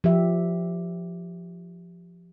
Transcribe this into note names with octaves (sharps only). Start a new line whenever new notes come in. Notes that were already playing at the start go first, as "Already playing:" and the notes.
F3 G4 E5